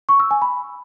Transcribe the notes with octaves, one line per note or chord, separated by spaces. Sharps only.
C#6
E6
G#5
B5